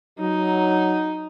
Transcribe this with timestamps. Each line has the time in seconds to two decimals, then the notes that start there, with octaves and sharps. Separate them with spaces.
0.19 F#3 D#4